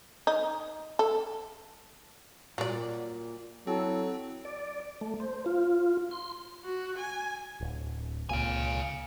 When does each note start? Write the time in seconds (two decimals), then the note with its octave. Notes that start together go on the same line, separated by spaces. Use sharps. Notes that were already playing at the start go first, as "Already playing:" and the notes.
0.27 D#4
0.99 A4
2.58 A#2 F#3 D5
3.67 F#3 C4 E4 A4
4.45 D5
5.01 A3
5.20 C5
5.46 F4
6.11 C6
6.65 F#4
6.99 G#5
7.60 D1
8.29 C#2 A#2 F5 G#5